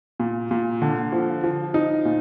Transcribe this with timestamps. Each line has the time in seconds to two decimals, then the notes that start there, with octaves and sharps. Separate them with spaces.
0.20 A#2
0.51 A#2
0.82 D3
1.12 F3
1.44 F3
1.74 D#4
2.05 A#2